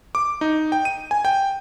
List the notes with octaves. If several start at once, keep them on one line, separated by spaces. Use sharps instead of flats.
D6
D#4
G5
D#7
G#5
G5